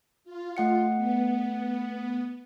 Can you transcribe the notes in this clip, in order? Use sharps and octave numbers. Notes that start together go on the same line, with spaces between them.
F4
A3 F#5 C#7
B3